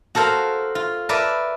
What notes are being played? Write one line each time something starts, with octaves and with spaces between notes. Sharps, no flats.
F#4 A4 A#4 C5 F5
F4
A#4 B4 D5 E5 A5